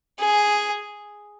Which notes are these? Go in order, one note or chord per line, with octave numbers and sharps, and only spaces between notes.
G#4